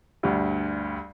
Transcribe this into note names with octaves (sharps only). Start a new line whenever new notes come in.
D2 G2